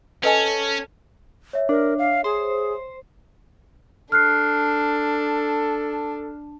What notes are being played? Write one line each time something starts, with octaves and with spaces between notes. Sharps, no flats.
C#4 A4 B4 D#5 G#5
C#5 E5
D4 A#4
F5
G#4 C5
D4 A4 F6 F#6 C7